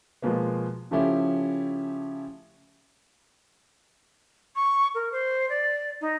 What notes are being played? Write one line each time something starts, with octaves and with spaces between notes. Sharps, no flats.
B2 F3 G#3 A#3 B3
C#3 F3 A3 C#4 E4 G4
C#6
A#4
C5
D5
D#4